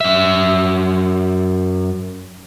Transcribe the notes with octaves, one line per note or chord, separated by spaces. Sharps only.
F#2 E5